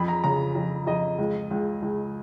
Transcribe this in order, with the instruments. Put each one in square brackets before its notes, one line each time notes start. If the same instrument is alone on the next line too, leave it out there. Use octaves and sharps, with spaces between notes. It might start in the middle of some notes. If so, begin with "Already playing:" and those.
Already playing: [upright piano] F2 B5
A#5
C#3 A#5
F2
F2 D#5
C#2
C#2
C#2